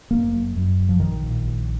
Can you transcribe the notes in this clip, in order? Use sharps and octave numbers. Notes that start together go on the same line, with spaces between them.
F#1 A#3
F#2
F#2
F#1
F3
A#1 D#3
A#2
A#1